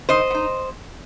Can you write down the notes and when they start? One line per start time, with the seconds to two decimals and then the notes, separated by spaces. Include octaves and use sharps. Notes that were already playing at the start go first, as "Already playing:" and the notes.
0.09 D#3 C5 D#5
0.30 B3
0.35 D#4